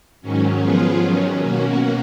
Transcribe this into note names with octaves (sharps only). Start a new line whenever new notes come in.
G#2 D#3 F#3 C#4
F3 B3 F4 G#4
D#3 F#3 C#4
B2 A#3 C#4 F#4